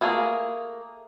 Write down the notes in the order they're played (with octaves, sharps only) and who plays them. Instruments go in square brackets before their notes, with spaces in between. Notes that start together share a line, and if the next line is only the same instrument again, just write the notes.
[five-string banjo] A3 A#3 G#4 A#4